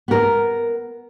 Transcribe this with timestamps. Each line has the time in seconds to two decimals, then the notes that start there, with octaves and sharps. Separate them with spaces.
0.08 B3 A#4